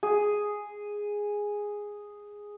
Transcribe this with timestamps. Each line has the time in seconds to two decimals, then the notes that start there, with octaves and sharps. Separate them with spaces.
0.03 G#4